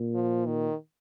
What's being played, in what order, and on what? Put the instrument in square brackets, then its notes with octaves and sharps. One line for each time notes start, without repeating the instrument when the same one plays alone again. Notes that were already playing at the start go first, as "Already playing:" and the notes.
Already playing: [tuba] A#2
[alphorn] F3
D#3